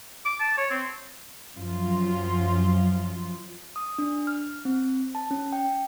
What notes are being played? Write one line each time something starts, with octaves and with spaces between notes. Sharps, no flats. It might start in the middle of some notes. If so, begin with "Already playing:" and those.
D6
A5
C#5
C4
F#2 F3 F4
D#6
D4
F6
C4
A5
C#4
G5